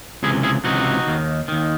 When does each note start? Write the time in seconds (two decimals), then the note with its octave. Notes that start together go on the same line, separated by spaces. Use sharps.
0.23 C#2 C3 E3 E4 G#4
0.43 E4 G#4
0.64 C#2 C3 E3 D#4 F#4
1.07 D#2 D#3
1.48 D#2 D#3